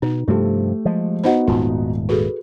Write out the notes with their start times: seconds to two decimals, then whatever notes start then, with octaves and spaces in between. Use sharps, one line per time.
0.02 B2 D#4
0.28 G2 C3 F3 A3 G4
0.85 F3 G#3
1.24 B3 D#4 F#4 C5 D#5 F#5
1.47 D#1 G#2 F4
2.09 F#4 G#4 A4 B4